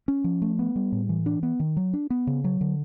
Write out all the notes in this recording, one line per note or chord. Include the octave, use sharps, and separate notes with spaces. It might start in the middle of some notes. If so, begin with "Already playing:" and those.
C#4
F3
A3
B3
G3
A2
E3
D4
B3
D#3
F#3
D4
B3
C#3
F#3
D3